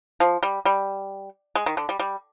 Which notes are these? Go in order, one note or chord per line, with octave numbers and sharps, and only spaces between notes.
F3
G3
G3
G#3
D#3
D3
G3
G3